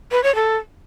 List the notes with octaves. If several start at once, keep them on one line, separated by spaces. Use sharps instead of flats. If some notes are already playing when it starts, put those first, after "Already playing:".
B4
C#5
A4